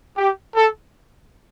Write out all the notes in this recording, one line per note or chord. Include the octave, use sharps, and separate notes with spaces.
G4
A4